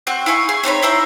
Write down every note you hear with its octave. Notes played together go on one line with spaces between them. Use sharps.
C4 F#4 F#6
E4 F5 G#5 C#6
G#4
C4 D#4 C#5 B5
E4 C5 E5 A#5